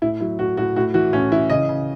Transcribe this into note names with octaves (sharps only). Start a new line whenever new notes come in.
A2 E4
F#3 E4
A2 F#4
A2 F#4
A2 F#4
E3 F#4
A2 C#4
E3 E4
C#3 D#5
C#3